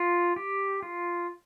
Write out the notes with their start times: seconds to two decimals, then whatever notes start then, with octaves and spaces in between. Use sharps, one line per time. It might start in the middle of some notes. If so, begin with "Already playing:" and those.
Already playing: F4
0.36 G4
0.82 F4